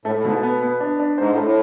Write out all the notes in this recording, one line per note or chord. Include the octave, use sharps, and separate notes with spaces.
A2 A3
A2
G#2 B2
B3
B3
D4
D4
G#2 C5
A2
A3
A2